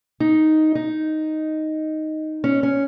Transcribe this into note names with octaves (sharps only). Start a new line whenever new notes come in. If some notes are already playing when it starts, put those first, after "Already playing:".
D#4
D#4
C#4
C#4